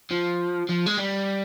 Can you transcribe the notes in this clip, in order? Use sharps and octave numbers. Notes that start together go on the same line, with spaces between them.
F3
F3
G#3
G3